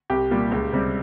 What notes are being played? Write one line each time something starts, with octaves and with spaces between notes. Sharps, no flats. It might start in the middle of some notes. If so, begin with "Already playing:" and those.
C2 G4
A#2 G3
C#2
C3 G3